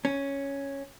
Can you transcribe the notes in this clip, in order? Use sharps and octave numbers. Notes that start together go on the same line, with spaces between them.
C#4